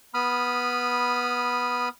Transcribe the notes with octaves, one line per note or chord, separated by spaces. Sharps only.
B3 B5 D#6 F6